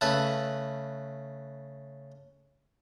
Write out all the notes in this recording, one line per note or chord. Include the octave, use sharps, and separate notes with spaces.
C#3 A3 B4 A5